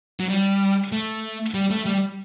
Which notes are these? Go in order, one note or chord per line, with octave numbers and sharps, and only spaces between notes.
F#3
G3
A3
G3
A3
G3